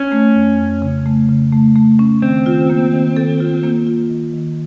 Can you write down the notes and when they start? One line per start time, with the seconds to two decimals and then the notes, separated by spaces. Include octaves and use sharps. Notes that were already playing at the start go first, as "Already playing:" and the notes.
Already playing: C#4
0.12 A3
0.35 F2
0.58 F2
0.82 C#3
1.06 A3
1.29 C#3
1.52 A3
1.76 A3
1.99 C#4
2.22 D#3 C4
2.46 F4
2.70 A#3
2.93 D#3
3.16 A4
3.40 F4
3.64 A#3
3.87 F4
4.10 D#3
4.34 D#3